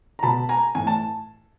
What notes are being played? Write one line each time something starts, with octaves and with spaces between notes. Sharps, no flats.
A#5
B2 A5 B5
G#5 A#5
A2 E3 G#5
A5